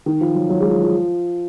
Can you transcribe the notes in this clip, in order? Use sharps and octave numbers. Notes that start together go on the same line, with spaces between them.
D#3
F3
F#3
F#3
G#3
F3
F3